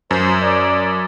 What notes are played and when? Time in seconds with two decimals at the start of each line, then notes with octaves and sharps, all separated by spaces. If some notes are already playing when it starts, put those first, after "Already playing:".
0.11 F#2 C5
0.42 D5